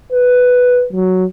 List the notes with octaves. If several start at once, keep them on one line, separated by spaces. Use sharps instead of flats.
B4
F#3